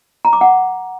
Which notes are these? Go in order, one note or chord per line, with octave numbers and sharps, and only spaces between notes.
A#5
D6
F#5